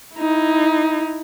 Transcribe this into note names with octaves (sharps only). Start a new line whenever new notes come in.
D#4 E4